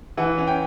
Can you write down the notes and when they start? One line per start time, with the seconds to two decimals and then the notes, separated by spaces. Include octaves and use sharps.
0.17 E3 F#5
0.38 C#4
0.47 G5